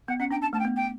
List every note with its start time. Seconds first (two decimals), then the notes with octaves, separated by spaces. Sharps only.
0.08 B3 F#5
0.19 C#4 F#5
0.31 D4 G5
0.41 A5
0.53 A3 A5
0.59 G5
0.65 B3
0.76 G5